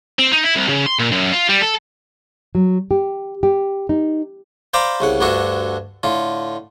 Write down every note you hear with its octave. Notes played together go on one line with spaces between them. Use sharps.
C4
D#4
E4
C2
C#3
C6
A#2
F#2
F4
G3
A4
F#3
G4
G4
D#4
C5 D5 F5 A#5 B5 D6
C2 C#3 F#5
D2 G2 D3 D4 F#4 A4
A2 D3 F4